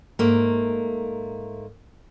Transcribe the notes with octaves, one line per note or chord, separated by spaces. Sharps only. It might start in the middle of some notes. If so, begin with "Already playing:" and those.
G#2 A3 A#3